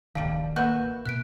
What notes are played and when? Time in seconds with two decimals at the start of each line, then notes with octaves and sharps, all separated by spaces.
0.15 D1 A#1 D#3 G3 D4 F5 A5
0.56 A#3 F#4 B4 E5 F#6 G6
1.06 B2 F#6 B6 D7